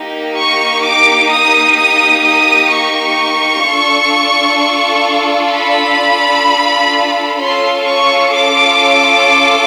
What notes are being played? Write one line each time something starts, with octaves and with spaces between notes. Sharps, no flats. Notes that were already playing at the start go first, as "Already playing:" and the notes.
Already playing: A#3 D#4 G4
C#6
D6
D#6
D#6
D#6
C#6
D4 F4 A4
B5
C#4 F4 A4 C6
C#6
D6